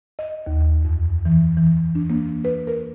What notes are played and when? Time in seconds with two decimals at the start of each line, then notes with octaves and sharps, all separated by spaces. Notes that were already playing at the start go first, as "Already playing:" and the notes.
0.19 D#5
0.46 D#2
0.85 F2
1.25 E3
1.57 E3
1.95 D4
2.10 A#3
2.45 B4
2.67 A#4